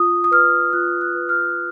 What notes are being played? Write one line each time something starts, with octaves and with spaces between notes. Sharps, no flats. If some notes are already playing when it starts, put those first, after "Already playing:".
Already playing: F4 D#6
D#6
B4 F6
F4 F#6
F#6
B4
F6